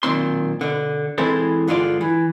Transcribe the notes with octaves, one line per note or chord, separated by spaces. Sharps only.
B1 A#2 D#3 C4 C6
B2 D3
E3 G#3 C4 E4 A4 C5
G2 D3 G#3 F4 D5
E3